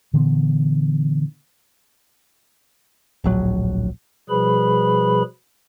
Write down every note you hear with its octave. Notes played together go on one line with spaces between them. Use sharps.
A#2 D3 E3 B3
D1 A#1 F#3
B2 F3 G3 G#4 B4 B5